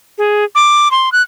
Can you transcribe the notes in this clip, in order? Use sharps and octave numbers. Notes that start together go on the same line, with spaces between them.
G#4
D6
C6
F#6